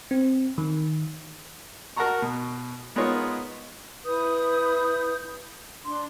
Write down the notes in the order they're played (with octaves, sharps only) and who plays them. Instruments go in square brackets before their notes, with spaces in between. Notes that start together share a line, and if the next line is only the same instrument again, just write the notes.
[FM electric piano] C4
D#3
[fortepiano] F#4 A#4 F#5 A5 A#5 C#6
B2
G#3 B3 D#4 F4 A#4 C#5
[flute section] E4 B4 D#6 G6
D4 C6